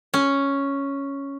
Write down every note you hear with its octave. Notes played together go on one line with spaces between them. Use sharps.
C#4